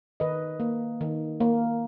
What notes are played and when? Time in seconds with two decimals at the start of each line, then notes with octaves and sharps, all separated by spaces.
0.20 D#3 B4 D#5
0.60 A#3
1.01 D#3
1.40 A#3